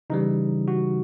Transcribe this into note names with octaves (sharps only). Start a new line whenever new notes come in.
C#3 E3 G3 D#4
F#4